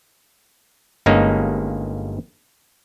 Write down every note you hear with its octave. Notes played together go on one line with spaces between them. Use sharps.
G1 G2 G#3 A#3 C#4 D#4